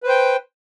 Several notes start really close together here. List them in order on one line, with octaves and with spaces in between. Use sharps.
B4 C5 G5